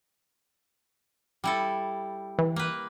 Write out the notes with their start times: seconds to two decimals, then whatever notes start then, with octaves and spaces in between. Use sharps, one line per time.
1.44 G3 E4 A4
2.38 E3
2.56 A#3 B4